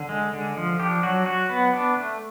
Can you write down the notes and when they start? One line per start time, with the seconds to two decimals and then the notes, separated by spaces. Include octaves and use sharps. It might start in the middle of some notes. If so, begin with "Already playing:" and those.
Already playing: D3
0.09 G#3
0.33 D3
0.57 F3
0.80 D4 G4
1.03 F#3 F#4
1.26 F#3 F#4
1.49 B3
1.73 D4
1.97 A3